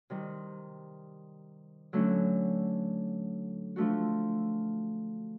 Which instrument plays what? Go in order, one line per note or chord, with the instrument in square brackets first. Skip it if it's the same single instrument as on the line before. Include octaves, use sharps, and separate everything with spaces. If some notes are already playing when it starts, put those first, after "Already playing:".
[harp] C3 D#3 G3
D3 F#3 A3 C#4
F3 A3 D4 F#4